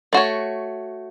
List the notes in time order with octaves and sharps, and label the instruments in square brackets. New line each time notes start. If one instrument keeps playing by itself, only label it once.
[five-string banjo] A3 F#4 C#5